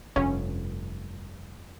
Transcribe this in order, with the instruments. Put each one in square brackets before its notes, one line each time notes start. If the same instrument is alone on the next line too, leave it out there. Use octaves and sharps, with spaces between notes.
[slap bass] F1 G2 [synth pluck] C#4